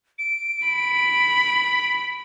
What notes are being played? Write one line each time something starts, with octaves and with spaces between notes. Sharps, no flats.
D7
B5